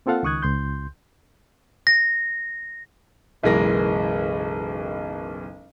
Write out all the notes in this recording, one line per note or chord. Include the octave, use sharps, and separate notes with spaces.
A#3 C4 F4 A4 F5 F#5
C#2 D#3 C#6 D#6 F#6 G#6
C#2 C6 G6
A#6
F#1 B1 E3 G#3 A#4 A#6